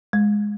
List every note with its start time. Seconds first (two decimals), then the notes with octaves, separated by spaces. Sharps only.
0.13 G#3